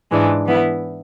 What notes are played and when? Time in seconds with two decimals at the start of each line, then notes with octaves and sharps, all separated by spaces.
0.11 G#2 E3 G#3 D4
0.45 E3 B3 E4